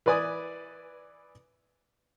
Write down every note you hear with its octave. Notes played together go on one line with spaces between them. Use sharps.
E3 B4 D5 G#5 D#6